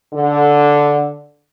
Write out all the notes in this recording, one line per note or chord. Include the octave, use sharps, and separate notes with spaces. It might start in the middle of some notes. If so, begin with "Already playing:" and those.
D3